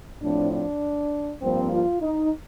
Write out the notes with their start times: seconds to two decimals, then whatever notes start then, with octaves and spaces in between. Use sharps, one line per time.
0.22 A2 F3 C4 D4
0.52 D4
1.42 G2 F3 A#3 C4
1.72 F4
2.02 D#4